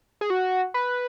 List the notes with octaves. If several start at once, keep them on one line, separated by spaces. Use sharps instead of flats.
G#4
F#4
B4